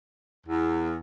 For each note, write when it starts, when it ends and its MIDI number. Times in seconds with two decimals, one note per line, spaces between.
0.47 0.96 40